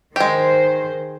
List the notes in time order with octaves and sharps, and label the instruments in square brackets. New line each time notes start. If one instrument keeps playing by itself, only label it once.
[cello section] D#3 C5 [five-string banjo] G#3 G4